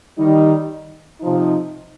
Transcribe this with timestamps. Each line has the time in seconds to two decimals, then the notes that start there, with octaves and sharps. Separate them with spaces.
0.18 D#3 G3 D#4
1.20 C3 F3 D#4